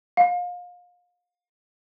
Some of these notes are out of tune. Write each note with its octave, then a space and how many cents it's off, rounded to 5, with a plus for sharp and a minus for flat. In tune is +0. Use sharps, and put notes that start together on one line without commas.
F5 +30